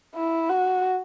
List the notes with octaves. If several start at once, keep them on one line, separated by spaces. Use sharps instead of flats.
E4
F#4